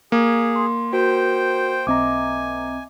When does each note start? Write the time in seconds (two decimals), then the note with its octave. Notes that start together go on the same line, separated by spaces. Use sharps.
0.12 A#3 G#4
0.56 C6
0.93 F#4 A#4 C5 G5
1.87 B1 C4 D#5 E5 G#5 A#5 D6